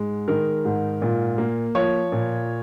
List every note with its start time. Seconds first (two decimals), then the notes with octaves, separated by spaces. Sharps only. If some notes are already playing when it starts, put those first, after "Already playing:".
Already playing: G#2 G#3
0.28 D#3 A#4
0.65 G#2
1.02 A#2
1.38 A#3
1.75 F3 C#5
2.12 A#2